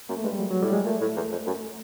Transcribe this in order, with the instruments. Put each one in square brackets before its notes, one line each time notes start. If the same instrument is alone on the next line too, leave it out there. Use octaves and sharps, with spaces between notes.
[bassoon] F#2 [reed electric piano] A#3
[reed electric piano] A3
[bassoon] G2 [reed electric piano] G#3
[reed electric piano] G3
F#3
F#3
[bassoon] A2 [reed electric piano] G3
[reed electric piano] G#3
[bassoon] A#2 [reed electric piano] A3
[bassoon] A2
E2
F2
F#2